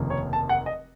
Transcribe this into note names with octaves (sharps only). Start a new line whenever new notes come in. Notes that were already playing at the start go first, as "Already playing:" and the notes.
Already playing: F1 D#2 C#3 F3 A#3
C#5
A5
F#5
D#5